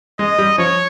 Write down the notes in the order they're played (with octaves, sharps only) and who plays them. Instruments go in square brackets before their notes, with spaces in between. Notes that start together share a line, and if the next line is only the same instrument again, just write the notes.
[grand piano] G#3 [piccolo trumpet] D#5
[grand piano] G3
[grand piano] F3 [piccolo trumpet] C#5